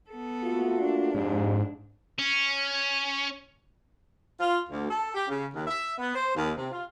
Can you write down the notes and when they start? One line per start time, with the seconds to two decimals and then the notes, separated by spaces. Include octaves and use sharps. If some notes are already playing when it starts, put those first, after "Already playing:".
0.10 B3 A4
0.43 A3 A#3 F4 F#4
0.81 D4
1.15 F2 G#2 G4
2.19 C#4
4.40 F4
4.67 D2
4.90 A4
5.14 G4
5.28 C#3
5.54 D#2
5.67 E5
5.98 B3
6.15 C5
6.35 D#2
6.56 C3
6.72 F4